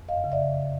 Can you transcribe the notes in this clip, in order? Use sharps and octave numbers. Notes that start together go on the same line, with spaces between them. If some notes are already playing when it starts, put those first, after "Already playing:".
Already playing: F2
F#2 D#5 F5
C#3
D5 E5
C#3